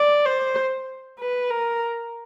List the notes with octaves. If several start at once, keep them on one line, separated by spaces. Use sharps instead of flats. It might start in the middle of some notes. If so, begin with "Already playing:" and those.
Already playing: D5
C5
B4
A#4